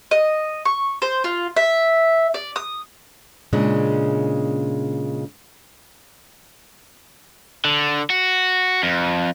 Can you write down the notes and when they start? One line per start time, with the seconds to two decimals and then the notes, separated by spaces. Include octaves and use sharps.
0.11 D#5
0.65 C#6
1.02 C5
1.24 F4
1.56 E5
2.34 D5
2.56 D#6
3.53 A#2 C#3 G#3 D4
7.65 D3
8.10 F#4
8.83 F2